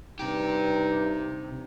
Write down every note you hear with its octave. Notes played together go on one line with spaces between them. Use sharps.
G2 C3 D#4 G4